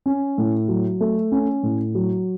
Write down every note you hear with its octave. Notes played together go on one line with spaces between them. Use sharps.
C#4
A2
F#3
A3
C#4
A2
F#3